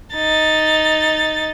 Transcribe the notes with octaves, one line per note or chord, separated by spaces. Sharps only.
D#4 A6